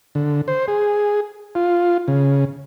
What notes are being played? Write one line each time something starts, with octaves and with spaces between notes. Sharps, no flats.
D3
C5
G#4
F4
C#3